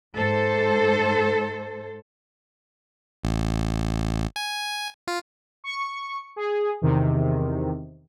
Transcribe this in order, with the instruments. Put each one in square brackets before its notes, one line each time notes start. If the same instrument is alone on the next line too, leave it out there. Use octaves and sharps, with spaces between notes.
[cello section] G#2 A4 C5
[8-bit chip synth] A1
G#5
F4
[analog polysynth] C#6 C#7
G#4
E2 C3 D#3